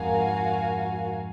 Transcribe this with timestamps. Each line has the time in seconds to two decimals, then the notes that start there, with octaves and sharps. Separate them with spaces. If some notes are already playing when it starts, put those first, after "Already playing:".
Already playing: F2 G#2 F#4 A#4 F5 G#5